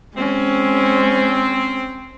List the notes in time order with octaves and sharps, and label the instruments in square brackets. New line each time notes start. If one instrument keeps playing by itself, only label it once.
[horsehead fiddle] G#3 C#4 [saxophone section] C4